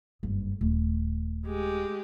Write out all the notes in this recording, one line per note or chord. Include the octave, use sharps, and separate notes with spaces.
F#1 G2
D#1 A3
G#3 G4